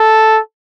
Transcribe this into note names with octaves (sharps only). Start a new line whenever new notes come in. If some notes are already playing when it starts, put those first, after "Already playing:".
Already playing: A4